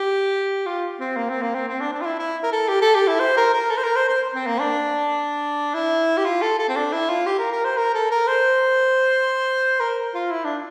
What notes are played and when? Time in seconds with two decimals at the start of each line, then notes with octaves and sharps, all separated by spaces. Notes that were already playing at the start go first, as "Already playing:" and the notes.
Already playing: G4
0.66 F4
1.00 C4
1.17 A#3
1.30 C4
1.42 A#3
1.55 C4
1.68 C4
1.81 D4
1.93 D4
2.01 F4
2.06 E4
2.19 E4
2.43 A#4
2.52 A4
2.69 G4
2.82 A4
2.95 G4
3.07 E4
3.20 C5
3.37 A#4
3.54 A#4
3.70 A4
3.77 C5
3.83 A#4
3.96 C5
4.09 C5
4.34 C4
4.47 A#3
4.60 D4
5.74 E4
6.18 G4
6.25 F4
6.42 A4
6.59 A4
6.69 C4
6.76 D4
6.92 E4
7.09 F4
7.26 G4
7.39 A#4
7.52 A#4
7.65 C5
7.77 A#4
7.95 A4
8.11 A#4
8.28 C5
9.80 A#4
10.14 F4
10.31 E4
10.45 D4